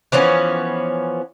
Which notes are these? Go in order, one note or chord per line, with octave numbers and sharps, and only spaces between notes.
E3 F3 B3 C#4